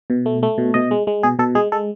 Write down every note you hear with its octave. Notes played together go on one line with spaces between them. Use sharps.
B2
A3
A3
B2
B2 D#5
G#3
G#3
B2 G#4
B2 A4
G#3 G#4
G#3 A4